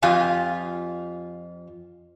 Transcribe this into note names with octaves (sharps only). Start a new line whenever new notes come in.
F2 F4 G4 G#5